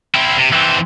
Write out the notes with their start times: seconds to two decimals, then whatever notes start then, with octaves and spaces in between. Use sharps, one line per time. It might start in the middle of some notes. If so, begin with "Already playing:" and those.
0.15 C4 E4
0.38 C3
0.53 E3 C4